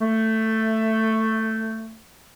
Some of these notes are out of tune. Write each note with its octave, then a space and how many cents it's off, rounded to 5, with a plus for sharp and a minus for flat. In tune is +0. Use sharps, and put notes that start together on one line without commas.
A3 +10